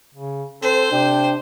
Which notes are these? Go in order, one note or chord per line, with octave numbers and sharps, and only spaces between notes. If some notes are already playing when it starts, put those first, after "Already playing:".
C#3
C4 A4 C5
C3 D4 G5